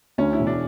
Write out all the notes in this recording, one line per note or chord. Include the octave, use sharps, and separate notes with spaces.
D2 C#4
E4
E1
D4